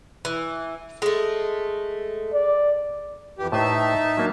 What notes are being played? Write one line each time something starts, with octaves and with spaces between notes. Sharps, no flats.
E3
G#3 A3
D5
F2 E3 G4
A2 D#4 B4 C5 E5 A5
F#3 A#3 D4